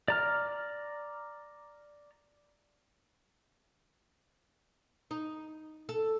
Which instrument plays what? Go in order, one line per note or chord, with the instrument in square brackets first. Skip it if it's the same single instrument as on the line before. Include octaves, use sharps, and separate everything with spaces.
[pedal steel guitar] D5 A#5 F6
[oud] D#4
A4